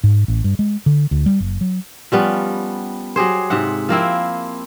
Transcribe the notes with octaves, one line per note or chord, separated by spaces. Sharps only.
G#2
A1
G2
G#3
D3
D2
G3
F#1
F#3
F3 G3 B3 C#4
F#3 G4 G#4 C5
G#2 C3 E5 F#5
F3 A#3 C4 E4